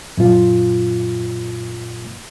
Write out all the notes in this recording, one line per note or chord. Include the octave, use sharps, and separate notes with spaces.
F#2 A#2 F4